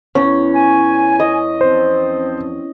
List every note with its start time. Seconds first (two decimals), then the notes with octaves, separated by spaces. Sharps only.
0.15 E2 C#4
0.53 G#5
1.20 D#5
1.61 F3 C4 C5